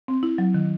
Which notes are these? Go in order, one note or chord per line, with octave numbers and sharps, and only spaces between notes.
C4
E4
F#3
D#3